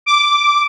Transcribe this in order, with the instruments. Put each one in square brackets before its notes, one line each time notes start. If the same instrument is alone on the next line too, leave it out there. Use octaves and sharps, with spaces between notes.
[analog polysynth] D6